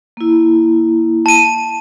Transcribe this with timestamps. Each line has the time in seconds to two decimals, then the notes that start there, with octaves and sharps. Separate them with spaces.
0.17 A#3 E4
1.26 A5 D#7